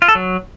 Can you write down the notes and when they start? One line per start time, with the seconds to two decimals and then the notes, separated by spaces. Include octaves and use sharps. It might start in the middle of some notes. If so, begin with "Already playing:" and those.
0.02 F4
0.08 A4
0.15 F#3